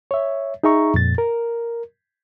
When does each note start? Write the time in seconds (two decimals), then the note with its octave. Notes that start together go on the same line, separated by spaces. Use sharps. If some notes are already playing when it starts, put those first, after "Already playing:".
0.11 C#5 E5
0.64 D#4 G#4 E5 A#5 C#6
0.94 F2 A#2 A6
1.18 A#4